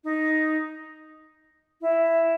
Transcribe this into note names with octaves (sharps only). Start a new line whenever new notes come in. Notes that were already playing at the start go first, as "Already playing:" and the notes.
D#4
E4